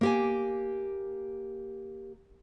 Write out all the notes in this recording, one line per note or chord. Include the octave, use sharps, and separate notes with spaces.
A#3 G4 G#5